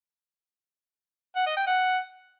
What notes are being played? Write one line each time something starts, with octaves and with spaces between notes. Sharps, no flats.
F#5
D#5
G5
F#5